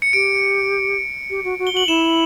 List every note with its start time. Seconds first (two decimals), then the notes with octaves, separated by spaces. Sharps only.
0.02 C#7
0.13 G4 D7
1.30 G4
1.44 F#4
1.59 F#4
1.67 G7
1.73 F#4 F#7
1.87 E4 E7